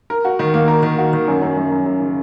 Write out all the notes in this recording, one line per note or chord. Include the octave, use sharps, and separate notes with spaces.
A#4
F#4
D#3
A#3
A#4
D#3
F#4
D#3
F#2
F#2
F#2
F#2
F#2
C#3